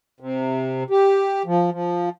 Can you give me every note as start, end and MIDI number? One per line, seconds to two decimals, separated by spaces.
0.20 0.84 48
0.90 1.43 67
1.46 1.70 53
1.72 2.09 53